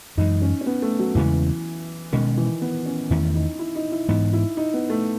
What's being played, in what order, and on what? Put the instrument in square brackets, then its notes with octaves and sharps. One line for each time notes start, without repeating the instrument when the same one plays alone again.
[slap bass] F#2 E3 G#3 [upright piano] D#4
[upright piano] C#4
C#4
B3
A3
F#3
[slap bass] E2 C#3 G#3 C#4 [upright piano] E3
[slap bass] B2 G#3 C#4 [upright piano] D#3
[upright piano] E3
B3
C#4
[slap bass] E2 D#3 A3 C#4 [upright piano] E4
[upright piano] D#4
E4
D#4
E4
[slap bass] G#2 E3 B3 [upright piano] D#4
[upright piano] E4
D#4
B3
A3